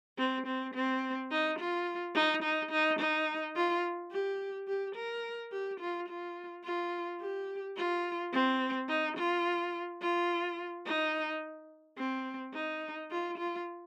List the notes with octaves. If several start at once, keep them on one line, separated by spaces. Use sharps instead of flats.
C4
C4
C4
D#4
F4
D#4
D#4
D#4
D#4
F4
G4
G4
A#4
G4
F4
F4
F4
G4
F4
C4
D#4
F4
F4
D#4
C4
D#4
F4
F4